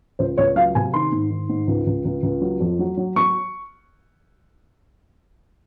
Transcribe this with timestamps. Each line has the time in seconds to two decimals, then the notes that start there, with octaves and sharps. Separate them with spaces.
0.19 C#2 C5
0.38 C#2 C#5
0.56 F#3 F5
0.75 C3 G#5
0.93 D#3 C6
1.12 G#2
1.30 D#3
1.49 G#2
1.67 C#2
1.87 C#2
2.05 C#2
2.23 C#2
2.41 F#3
2.60 F2
2.79 F#3
2.97 F#3
3.16 F#3 C#6